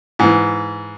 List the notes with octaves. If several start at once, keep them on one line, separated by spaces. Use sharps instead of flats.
G#2 E3